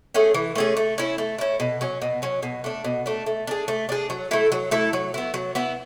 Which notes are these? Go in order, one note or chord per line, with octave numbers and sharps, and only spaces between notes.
A3 C#4 G#4
E3
A3 C#4 G#4
A3
C#4 E4
A3
C#4 E4
B2
F#3 C#4
B2
F#3 C#4
B2
A3 D4
B2
A3 D4
A3
D4 G#4
A3
D4 G#4
F#3
A3 E4 A4
F#3
A3 E4 A4
F#3
B3 E4
F#3
B3 E4